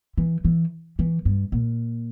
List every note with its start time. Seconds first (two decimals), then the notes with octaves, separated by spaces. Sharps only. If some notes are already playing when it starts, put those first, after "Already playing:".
0.18 E3
0.45 E3
0.99 E3
1.25 G2
1.52 A#2